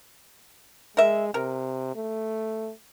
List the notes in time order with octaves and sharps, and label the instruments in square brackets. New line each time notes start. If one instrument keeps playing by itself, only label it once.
[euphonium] G#3 [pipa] A#4 E5
[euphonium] C3 [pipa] A#4
[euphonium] A3